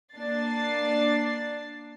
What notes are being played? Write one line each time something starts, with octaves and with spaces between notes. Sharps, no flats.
A#3 D4 A6 C7